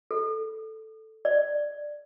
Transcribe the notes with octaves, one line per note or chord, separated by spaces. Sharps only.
A4
D5